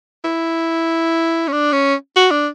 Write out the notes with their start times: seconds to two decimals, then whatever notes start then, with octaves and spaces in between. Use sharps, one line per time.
0.25 E4
1.48 C#4
1.52 D4
1.72 C#4
2.16 F#4
2.31 D4